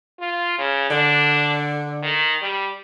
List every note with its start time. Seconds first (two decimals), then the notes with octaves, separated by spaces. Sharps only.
0.19 F4
0.58 C#3
0.90 D3 D4
2.03 D#3
2.41 G3